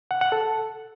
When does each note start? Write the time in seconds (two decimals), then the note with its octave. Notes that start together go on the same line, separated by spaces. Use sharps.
0.11 F#5
0.21 F#5
0.32 A4